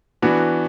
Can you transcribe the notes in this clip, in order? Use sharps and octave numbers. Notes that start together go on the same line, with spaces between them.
E3 B3 D4 F#4